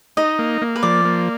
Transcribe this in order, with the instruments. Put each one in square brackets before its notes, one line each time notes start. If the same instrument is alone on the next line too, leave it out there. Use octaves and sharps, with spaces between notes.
[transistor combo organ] D#4 [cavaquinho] D#5
[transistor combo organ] A#3
A#3
[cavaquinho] B4
[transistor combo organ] F3 [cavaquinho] D5
[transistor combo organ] A#3